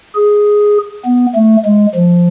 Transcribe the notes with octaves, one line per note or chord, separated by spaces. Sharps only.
G#4
B3
A3
G#3
F3